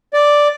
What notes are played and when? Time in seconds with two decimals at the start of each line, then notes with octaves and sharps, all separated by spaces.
0.13 D5